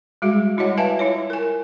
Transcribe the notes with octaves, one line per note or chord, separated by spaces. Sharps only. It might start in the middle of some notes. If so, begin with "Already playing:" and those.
G3 G#3 F#4 G#4 E5
G3 E4 F#4 C#5 D#5 F#5
B4 E5 F5 G#5 A5
E4 F4 C#5
A#4 G#5